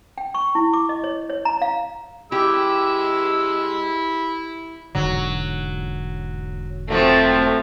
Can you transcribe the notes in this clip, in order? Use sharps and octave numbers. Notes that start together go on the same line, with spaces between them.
G5
C#6
E4
D6
D#5
C#5
C#5
A#5
F5
G#3 E4 G4 E6
E1 G#2 D3 F#3
F3 F#3 A3 C4